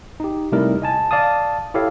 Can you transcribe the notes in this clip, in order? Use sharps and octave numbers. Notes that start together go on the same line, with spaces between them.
D#4 G4
C3 G3 A3 D#4 E4 A#4
D#5 G#5 A5
D5 F5 A5 D#6
E4 G4 A4 C#5 F5